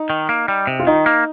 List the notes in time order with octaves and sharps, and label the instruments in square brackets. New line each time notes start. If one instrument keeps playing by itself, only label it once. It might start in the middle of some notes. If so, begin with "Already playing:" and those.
Already playing: [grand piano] D#4
[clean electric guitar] D#3
A#3
G3
C3
[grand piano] F4
[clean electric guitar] D#3 [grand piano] D#4
[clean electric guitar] A#3